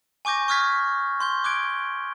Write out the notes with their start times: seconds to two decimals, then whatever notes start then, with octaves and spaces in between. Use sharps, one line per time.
0.25 G#5 C#6 D6 G6 A#6
0.48 C#6 D#6 F6 G#6 B6
1.20 C6 G6 G7
1.44 D6 F#6 G#6 D7